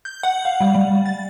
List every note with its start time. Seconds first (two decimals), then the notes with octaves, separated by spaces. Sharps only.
0.05 G6
0.23 F#5
0.45 F5
0.60 G3
0.74 G3
1.06 A6